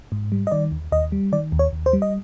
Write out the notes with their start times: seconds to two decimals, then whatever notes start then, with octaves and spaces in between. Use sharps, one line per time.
0.12 G#2
0.32 G3
0.47 D#5
0.52 D#3 D5
0.72 D#2
0.92 D#2 D#5
1.12 G3
1.32 D#3 D5
1.52 D#2
1.59 C#5
1.72 D#2
1.86 C5
1.93 G3
2.02 D#5